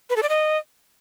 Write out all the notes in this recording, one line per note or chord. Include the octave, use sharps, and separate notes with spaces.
B4
A4
D5
D#5